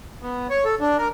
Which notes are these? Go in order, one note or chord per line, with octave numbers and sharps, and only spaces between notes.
B3
C#5
A4
D4
A#4